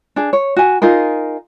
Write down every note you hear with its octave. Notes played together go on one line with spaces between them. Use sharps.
D4 G#4
C#5
F#4 G#5
D#4 F4 G#4 A#4